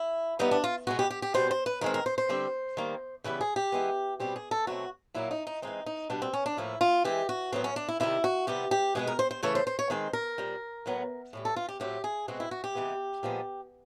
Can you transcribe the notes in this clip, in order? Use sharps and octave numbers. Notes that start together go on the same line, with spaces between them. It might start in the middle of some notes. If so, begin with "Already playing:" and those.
Already playing: E4
E3 G3 B3 D#4
D4
F4
B2 G#3 B3 F#4
G4
G4
G4
B2 G3 C4 C5
C5
B4
D#3 G#3 C4 A#4
A#4
C5
C5
D3 G3 C4
D#3 G3 A#3
C#3 E3 G3 B3 B4
G#4
G4
E3 G#3 B3
B2 G3 C4 G4
G#4
A4
B2 F#3 A3 C4 F#4
A#2 F#3 A#3 E4
D#4
D#4
E3 G#3 C4 D#4
D#4
B2 G3 B3 D4
C4
C#4
D4
A2 F3 A#3 E4
F4
E3 G#3 C4 G4
F#4
A2 F#3 B3 C4
C#4
D4
E4
C3 D#3 G3 E4
F#4
C3 E3 G3 B3 G4
G4
B2 G#3 B3 G#4
A#4
C5
C5
C#3 E3 A3 C#5
C5
C5
C#5
D#3 G#3 C4 C5
A#4
A#2 G3 C4
A2 F#3 B3
A2 E3 G3
A4
F4
G4
A2 F#3 A3 C4 G4
G#4
B2 G#3 C4 F#4
E4
F#4
G4
C3 E3 G#3 B3
A#2 F3 G#3 B3